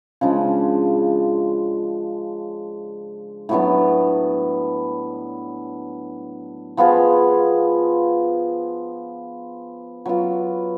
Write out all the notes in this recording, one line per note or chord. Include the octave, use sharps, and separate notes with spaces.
C#3 F3 G#3 D4
A2 F#3 B3 D4
F3 B3 F4 G#4
F#3 B3 F4